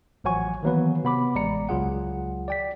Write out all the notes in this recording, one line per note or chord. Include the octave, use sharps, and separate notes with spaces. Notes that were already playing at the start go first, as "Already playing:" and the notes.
A1 F3 F#3 F#5 G#5 C#6
D#3 E3 F#3 A#3 B3 B4
C3 B3 B5 D6
A1 G#3 D5 A#5 C#7
C#2 F#3 F4 G#4 F#5
D5 G5 B6